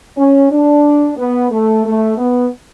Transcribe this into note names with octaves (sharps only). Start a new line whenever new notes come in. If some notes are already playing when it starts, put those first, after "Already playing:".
C#4
D4
B3
A3
A3
B3